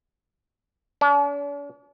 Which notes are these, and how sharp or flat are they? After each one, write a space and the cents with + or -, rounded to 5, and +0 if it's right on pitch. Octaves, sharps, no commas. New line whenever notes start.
D4 -45